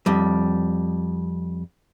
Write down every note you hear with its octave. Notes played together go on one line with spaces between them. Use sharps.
F2 G3